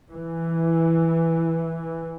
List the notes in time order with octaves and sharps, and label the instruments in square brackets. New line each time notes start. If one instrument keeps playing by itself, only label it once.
[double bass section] E3